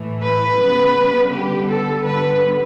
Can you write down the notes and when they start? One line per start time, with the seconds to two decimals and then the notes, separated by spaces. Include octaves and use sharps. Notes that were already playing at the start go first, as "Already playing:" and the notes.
Already playing: A2 E3 A3
0.21 B4
0.57 C#3 G3 B3
1.30 D3 G3 B3 G4
1.67 A4
2.04 D3 G3 B3 B4